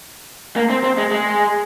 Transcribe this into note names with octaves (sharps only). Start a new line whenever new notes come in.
A#3
C4
C4
G#3
G#3